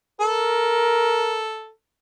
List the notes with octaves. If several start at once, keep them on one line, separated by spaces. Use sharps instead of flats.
A4 A#4